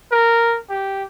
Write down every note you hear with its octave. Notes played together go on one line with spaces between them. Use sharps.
A#4
G4